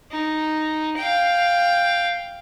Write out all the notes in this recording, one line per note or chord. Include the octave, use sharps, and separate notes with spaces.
D#4
F5 G5